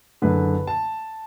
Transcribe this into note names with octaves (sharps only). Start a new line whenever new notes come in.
F#1 F#2 D3 B4
A5